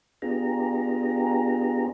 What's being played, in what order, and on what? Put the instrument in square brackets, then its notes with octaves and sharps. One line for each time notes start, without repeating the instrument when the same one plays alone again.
[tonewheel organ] B3 D4 F4 G4 G#4 A#5